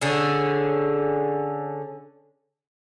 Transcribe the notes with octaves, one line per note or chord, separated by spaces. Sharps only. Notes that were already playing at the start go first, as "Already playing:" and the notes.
D3 C#4 G#4